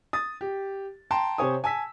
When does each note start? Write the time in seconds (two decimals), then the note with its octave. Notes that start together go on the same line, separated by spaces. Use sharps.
0.13 D#6 A6
0.41 G4
1.11 G5 A5 A#5 C6
1.38 C3 G4 C5 C#5 G#5 D#6
1.64 G#5 A5 E6 B6